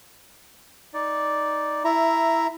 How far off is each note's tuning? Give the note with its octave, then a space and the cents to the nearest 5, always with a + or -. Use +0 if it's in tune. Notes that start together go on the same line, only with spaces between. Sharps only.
D#4 +5 D5 +0
E4 +0 E5 +10 A#5 +0